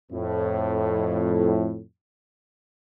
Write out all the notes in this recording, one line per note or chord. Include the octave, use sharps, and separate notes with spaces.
F2 A2